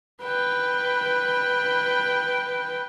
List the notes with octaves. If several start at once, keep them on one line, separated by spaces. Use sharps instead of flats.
B4 G5